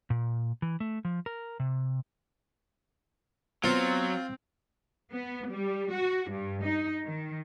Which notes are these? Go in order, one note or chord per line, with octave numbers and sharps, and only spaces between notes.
A#2
E3
A3
F3
A#4
C3
F#3 B3 C4 F4 C5 A6
B3
G3
F#4
G2
D#4
D#3